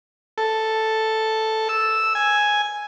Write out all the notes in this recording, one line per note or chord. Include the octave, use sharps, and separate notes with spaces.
A4
E6
G#5